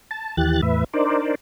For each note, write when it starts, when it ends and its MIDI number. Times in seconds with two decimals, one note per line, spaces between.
0.11 0.36 81
0.37 0.61 39
0.37 0.61 52
0.37 0.61 67
0.37 0.61 90
0.37 0.61 93
0.62 0.84 40
0.62 0.84 45
0.62 0.84 71
0.62 0.84 76
0.94 1.35 62
0.94 1.35 63
0.94 1.35 70
0.94 1.35 72
0.94 1.35 74